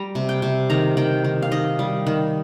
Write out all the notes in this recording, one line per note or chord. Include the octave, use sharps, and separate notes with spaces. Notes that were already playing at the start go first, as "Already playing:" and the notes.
Already playing: G3 A#5
C3
G5
C3
D#3 A#5
D#3 G5
D#3
F5
D#3 D#5
G3
D#3